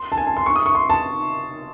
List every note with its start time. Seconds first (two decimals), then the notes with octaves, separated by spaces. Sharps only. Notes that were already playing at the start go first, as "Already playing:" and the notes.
Already playing: C6
0.12 A5
0.18 G#5
0.27 A5
0.37 C6
0.46 C#6
0.56 D#6
0.66 C#6
0.75 C6
0.90 A5